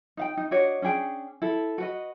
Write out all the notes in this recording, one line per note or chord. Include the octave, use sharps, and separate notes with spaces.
D#4 F5 G5
D#4
D4 F#4 C#5 D#5
C#4 D4 G#4 G5
E4 A4
F#4 B4 D#5